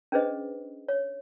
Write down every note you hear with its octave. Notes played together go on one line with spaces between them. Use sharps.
C#4 D4 G#4 B4 C5 D#5
C#5